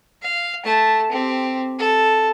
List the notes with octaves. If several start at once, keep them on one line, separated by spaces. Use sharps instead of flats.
F5
A3 A5
C4 G4
A4